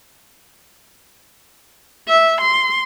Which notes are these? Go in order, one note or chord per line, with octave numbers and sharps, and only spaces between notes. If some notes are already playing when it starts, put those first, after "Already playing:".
E5
C6